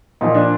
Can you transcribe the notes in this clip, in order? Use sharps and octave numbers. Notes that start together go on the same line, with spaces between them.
A#2 F3 D#4
D4